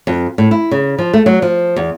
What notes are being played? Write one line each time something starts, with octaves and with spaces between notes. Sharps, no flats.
F2
A2
E4
C#3
F3
A3
F#3
F3
E2